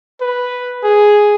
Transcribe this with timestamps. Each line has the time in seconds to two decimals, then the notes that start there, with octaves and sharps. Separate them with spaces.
0.21 B4
0.83 G#4